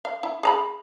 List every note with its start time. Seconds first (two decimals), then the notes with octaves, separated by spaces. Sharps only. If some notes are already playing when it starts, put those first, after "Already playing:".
0.05 F5
0.23 E4
0.43 G#4 A#5 B5